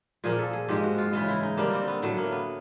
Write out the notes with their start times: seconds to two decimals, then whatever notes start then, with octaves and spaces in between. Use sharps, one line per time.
0.24 A#2 F3 A#3 G#4
0.39 A4
0.53 G#4
0.68 G#2 F3 G#3 G4
0.83 F#4
0.98 F4
1.13 C#3 E3 G#3 F4
1.28 E4
1.43 D#4
1.57 D3 G3 A#3 D4
1.73 C4
1.88 B3
2.02 A2 F#3 A3 B3
2.17 A#3
2.32 B3